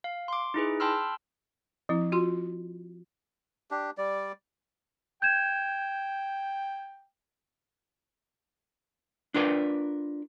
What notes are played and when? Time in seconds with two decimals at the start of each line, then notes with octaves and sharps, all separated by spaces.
0.04 F5
0.28 C6 D6
0.54 D#4 E4 G#4 B4
0.80 G5 A5 B5 C6 E6 F6
1.89 F3 C4 E4
2.12 F4 F#4 C6
3.71 D4 G4
3.98 G3 D5
5.22 G5 G6 G#6 E7
9.34 D4 F4 A#4 B4 D5